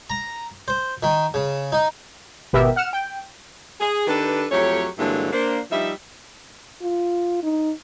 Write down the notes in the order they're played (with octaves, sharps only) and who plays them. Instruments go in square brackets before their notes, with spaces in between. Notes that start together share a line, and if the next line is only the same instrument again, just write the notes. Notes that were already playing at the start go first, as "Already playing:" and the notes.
[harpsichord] A#5
C5
D#3
C#3
D#4
[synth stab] G#1 B2 B3 G4 A#4 E5
F#5 F6 C#7 E7
G5
[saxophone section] G#4
D#3 D4 G4 A4 B4
F2 F#3 A3 G4 C#5
G2 D3 E3 F#3 G#3 A#3
A#3 D4 C5
F3 G3 D#4 E5
[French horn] F4
D#4